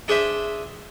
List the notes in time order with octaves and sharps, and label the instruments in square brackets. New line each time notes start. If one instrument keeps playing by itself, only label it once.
[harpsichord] D4 G#4 C5 E5